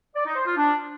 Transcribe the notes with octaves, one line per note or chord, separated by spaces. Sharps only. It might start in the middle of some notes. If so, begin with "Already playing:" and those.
D5
D#4
C5
F4
D4